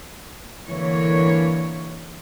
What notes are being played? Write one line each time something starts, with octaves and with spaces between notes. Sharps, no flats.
D3 E3 A#3 C#5